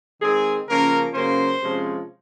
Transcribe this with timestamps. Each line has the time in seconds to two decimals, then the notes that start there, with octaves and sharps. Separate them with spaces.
0.22 D#3 G#3 C4 G#4
0.68 C#3 F3 A#3 C#4 A#4
1.14 C#3 F#3 A#3 C#4 C5
1.61 C3 F3 G#3 C#4